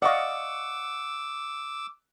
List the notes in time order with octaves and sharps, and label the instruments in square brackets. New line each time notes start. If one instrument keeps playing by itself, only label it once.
[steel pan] D5 D#5 F5 [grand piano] F#5 C#6 [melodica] D6 E6